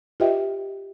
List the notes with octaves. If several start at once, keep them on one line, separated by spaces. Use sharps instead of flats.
F4 G4 B4 D#5 E5 G5